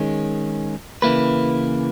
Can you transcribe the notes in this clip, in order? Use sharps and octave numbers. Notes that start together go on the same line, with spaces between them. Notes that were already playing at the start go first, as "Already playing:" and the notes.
Already playing: D#3 G#3 C#4
C#3 E3 A#3 E4 B4